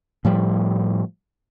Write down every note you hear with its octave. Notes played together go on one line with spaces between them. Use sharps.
A2 F3 G3